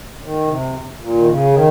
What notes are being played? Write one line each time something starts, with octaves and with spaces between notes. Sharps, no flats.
C#3
D#3
C3
A#2
D#3
C#3
D#3